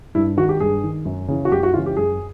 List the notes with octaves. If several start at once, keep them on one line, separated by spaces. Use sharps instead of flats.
G2 E4
D#3 F#4
G4
G2 G#4
D#3
F#2
C#3 E3
F#4
F#2 G4
F#4
C#3 E3 F4
G4
F#2 G#4